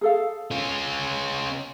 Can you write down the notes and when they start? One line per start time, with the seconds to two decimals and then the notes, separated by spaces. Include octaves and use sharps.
0.01 G#4 A4 F5
0.52 C#4 F4